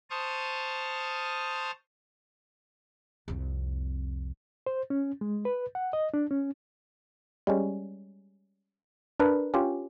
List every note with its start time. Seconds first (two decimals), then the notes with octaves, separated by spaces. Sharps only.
0.10 C5 A5 C#6 D#6 F6
3.28 C2 F2
4.67 C5
4.90 C#4
5.21 G#3
5.45 B4
5.75 F#5
5.93 D#5
6.14 D4
6.31 C#4
7.47 G3 G#3 C#4
9.20 D4 A#4 B4
9.54 C#4 F4 G4